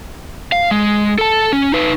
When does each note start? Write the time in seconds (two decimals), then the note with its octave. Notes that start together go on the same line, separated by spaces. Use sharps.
0.52 F5
0.71 G#3
1.18 A4 A5
1.53 C#4
1.72 D#4 B4